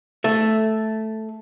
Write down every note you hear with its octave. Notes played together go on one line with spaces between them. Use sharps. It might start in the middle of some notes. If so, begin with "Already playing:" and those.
A3